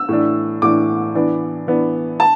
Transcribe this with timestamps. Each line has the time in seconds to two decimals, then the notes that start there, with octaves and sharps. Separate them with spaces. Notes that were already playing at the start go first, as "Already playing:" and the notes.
Already playing: E6
0.09 A2 E3 D4
0.62 A2 E3 D4 D6
1.15 E3 B3 D4
1.67 E3 B3 D4
2.20 A5